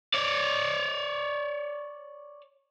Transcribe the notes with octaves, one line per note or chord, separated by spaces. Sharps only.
C#5 D5